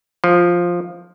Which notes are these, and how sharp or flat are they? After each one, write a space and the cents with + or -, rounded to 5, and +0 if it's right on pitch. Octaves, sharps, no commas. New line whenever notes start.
F3 +5